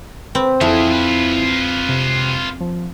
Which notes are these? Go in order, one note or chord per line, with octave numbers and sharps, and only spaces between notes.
C4 B4
F2 E3 E4 G#4
F4 B4
C3
F3